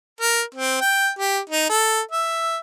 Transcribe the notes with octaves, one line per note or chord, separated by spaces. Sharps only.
A#4
C4
G5
G4
D#4
A4
E5